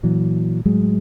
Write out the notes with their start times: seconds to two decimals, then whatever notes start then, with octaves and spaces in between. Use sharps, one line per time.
0.03 A#2 E3 F#3
0.65 A2 F#3 G#3